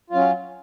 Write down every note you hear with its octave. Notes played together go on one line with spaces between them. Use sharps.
F#3 C#4 F4